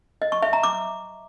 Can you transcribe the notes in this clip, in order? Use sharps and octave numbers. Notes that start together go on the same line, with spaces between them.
D#5
C#6
E5
A#5
D6